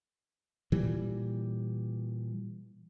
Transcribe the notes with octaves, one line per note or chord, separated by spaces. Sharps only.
A#2 E3 G3